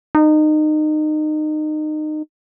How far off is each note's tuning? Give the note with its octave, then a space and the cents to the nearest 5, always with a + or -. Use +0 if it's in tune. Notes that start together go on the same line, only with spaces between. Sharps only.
D#4 -25